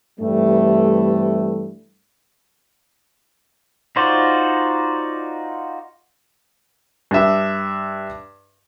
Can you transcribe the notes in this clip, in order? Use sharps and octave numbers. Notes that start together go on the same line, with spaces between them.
G2 C3 E3 G3 A3
D#4 F4 F#4 C5 D5
G2 E5